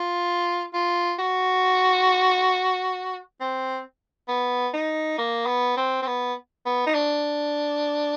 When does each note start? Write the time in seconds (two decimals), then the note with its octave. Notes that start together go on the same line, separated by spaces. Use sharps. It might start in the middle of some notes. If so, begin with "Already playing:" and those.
Already playing: F4
0.74 F4
1.19 F#4
3.40 C4
4.28 B3
4.74 D#4
5.18 A#3
5.46 B3
5.77 C4
6.02 C4
6.07 B3
6.66 B3
6.86 D#4
6.95 D4